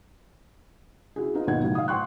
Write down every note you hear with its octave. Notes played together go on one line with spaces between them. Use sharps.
C#4 E4 F#4 G#4
B3 D#4 F4
G#1 D#2 B2 D#4 F#5 G#6
F#2 A2 C#3
F5 D#6
C5 F#5 G5 C6 C#6 F#6